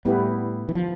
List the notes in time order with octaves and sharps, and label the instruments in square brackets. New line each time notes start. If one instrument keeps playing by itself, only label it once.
[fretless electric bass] A2 [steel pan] G3 B3 E4 G4 B4
[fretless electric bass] E3
F3